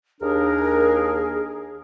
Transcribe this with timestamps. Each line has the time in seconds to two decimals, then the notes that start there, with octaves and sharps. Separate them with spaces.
0.21 D#2 D4 G#4 A#4